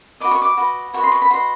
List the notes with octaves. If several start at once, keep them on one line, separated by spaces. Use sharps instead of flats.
F#4 B4 D#5 D6
C#6
D6
F#4 B4 D#5
F#4 B4 D#5 C#6
C6
C#6
B5
F#4 B4 D#5 C6